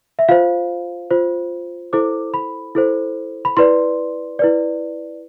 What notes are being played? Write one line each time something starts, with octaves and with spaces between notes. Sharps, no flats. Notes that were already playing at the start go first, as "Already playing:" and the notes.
E5
F4 C5 F5
F4 C5
E4 A4 C5 D6
B5
E4 A4 C5
B5
E4 B4 D5 C6
E4 B4 D5